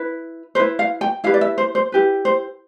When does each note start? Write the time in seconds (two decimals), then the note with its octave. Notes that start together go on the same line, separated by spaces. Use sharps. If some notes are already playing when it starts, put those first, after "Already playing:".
Already playing: E4 B4
0.55 E4 B4 C5
0.79 F5
1.01 G5
1.24 E4 G4 B4 F5
1.34 D5
1.41 E5
1.58 C5
1.75 C5
1.92 E4 G4 B4
2.25 C5